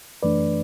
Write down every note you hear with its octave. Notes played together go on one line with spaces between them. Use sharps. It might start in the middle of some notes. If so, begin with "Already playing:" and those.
F#2 E3 A3 D4 B4 D5